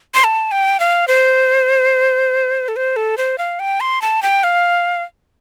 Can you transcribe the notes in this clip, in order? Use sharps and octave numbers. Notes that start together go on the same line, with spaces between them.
C6
A5
G5
F5
C5
A4
C5
A4
C5
F5
G5
C6
A5
G5
F5